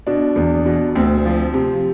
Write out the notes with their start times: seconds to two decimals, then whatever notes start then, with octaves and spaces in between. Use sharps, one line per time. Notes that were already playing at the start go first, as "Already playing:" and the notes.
0.07 B2 D4
0.36 E2
0.66 B2
0.95 D2 C4
1.25 F3
1.54 C3